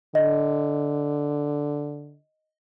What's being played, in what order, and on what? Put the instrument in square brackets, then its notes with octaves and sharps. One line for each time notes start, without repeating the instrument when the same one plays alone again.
[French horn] D3 [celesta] D#5